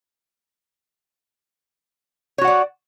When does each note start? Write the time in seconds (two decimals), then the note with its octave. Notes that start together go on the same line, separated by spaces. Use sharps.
2.38 C#5
2.41 F#4
2.44 F#5
2.47 D5